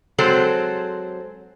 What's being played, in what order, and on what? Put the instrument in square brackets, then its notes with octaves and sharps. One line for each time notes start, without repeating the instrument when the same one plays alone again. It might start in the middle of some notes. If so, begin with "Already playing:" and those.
[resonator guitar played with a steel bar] F#3 G#3 C4 A4 C5